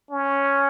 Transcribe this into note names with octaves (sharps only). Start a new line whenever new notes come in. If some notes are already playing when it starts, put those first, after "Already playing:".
C#4